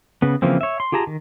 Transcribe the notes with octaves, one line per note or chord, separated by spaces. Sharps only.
C#3 B3
C#3 E3 F3 A#3 C4
C#5 E5
C6
F4 G4 G#4 A5 A#5
D#3